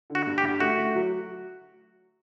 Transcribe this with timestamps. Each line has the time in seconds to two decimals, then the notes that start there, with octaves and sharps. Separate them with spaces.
0.10 D3
0.15 F#4
0.27 G2
0.38 G4
0.43 G2
0.60 A3 F#4
0.77 A3
0.95 F#3